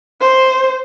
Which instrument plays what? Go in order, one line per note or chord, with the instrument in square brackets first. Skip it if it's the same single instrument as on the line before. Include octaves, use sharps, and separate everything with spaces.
[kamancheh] C5